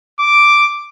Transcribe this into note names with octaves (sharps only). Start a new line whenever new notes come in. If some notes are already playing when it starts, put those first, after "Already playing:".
D6